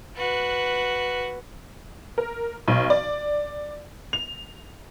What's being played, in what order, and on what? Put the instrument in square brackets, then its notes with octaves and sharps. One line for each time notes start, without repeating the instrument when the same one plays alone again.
[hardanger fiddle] F#4 B4
[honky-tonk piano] A#4
B1
D5
F7